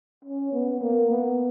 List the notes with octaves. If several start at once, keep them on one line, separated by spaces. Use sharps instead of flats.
C#4
B3
A#3
B3